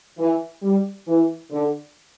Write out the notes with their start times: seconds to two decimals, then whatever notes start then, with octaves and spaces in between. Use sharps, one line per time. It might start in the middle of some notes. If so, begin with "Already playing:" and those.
0.19 E3
0.62 G3
1.07 E3
1.51 D3